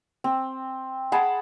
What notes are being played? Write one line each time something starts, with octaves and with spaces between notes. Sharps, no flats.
C4
G#4 F#5 A5 B5